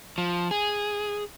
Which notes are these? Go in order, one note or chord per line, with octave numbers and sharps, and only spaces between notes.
F3
G#4